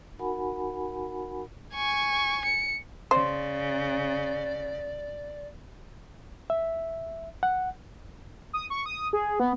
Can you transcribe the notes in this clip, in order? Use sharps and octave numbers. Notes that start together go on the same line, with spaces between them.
D#4 F#4 A#4 F#5 G#5 B5
G#5 C#6
C#7
C#3 C5 D5
E5
F#5
D#6
C#6
D#6
G#4
B3